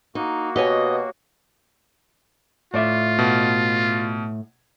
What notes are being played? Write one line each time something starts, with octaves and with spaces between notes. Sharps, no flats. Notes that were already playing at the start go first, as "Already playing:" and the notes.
A#3 D#4 F#4
B2 G4 C#5 D#5 G#5
A2 F4 D5 E5
B2